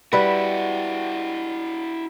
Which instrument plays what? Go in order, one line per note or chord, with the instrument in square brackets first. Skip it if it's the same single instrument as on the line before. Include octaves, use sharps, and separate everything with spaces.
[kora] G3 B4 [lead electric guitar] E4 F#4